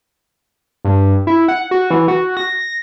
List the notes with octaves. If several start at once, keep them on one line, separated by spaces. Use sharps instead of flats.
G2
E4
F#5
F#4
E3
F#4
A#6
A#6